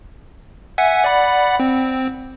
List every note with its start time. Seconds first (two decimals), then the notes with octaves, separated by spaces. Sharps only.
0.78 E5 F#5 G#5
1.04 D5 F#5 B5
1.60 C4